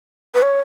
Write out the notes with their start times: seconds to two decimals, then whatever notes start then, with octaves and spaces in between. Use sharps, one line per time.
0.35 B4
0.42 C#5